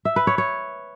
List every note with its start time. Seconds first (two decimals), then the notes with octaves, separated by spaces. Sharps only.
0.05 E5
0.16 B4
0.27 C#5
0.38 C#5